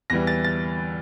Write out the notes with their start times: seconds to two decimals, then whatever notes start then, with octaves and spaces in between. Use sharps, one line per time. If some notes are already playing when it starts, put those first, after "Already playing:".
0.10 E2 E3 G3 A#6
0.27 A6
0.44 A6